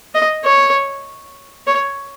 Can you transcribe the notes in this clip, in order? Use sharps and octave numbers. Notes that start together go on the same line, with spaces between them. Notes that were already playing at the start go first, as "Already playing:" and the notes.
D#5
C#5
C#5